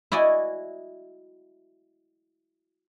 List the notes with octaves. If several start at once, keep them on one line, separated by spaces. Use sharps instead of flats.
E4 F#4 D5 D#5 G#5